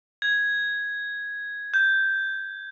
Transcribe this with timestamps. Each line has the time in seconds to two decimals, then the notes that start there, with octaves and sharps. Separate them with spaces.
0.22 G#6
1.74 G6